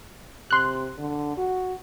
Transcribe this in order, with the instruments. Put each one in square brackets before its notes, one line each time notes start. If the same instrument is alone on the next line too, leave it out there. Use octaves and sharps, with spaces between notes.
[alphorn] C3 [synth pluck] C6 F#6
[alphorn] D3
F#4